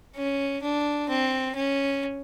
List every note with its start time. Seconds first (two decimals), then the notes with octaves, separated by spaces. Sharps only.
0.16 C#4
0.62 D4
1.09 C4
1.55 C#4